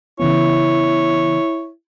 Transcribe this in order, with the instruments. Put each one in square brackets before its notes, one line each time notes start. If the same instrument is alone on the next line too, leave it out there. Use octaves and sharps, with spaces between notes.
[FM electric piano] C#3 E3 B3 [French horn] E4 [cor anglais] C#5